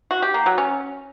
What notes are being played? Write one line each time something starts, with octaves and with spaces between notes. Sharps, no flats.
F#4
G4
A#3
F#3
C#4